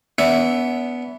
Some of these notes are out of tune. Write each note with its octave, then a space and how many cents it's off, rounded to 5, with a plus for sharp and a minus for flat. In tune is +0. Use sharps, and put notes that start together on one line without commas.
B3 +0 D4 -40 E5 -5